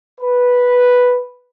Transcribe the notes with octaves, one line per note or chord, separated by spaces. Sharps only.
B4